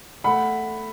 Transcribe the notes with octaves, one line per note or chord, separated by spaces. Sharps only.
A3 F#5 B5